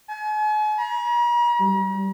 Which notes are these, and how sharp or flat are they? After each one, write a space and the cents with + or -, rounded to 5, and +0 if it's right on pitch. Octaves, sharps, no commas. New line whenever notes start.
G#5 +40
A#5 +45
G3 -25